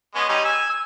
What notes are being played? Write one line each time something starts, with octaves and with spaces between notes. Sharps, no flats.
G#3 B3 C#4
G3 C#4 D#4
G#5 E6
E6